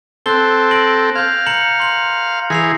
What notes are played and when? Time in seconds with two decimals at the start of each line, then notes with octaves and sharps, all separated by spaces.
0.26 C4 A4 F#6 G7
0.71 A#6 D7 F#7
1.15 F5 G6 G#6
1.47 A#5 C#7 F#7
1.80 C6 F#7
2.50 E3 G#4 A#6 C7 F7